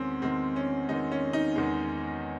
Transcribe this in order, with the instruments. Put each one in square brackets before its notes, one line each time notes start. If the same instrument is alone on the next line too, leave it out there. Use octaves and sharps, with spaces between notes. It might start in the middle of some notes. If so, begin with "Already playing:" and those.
Already playing: [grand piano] E2 D#3 G#3 C4 C#4
E2 D#3 G#3 C4
C#4
E2 D#3 G#3 D#4
C#4
D#4
E2 D#3 G#3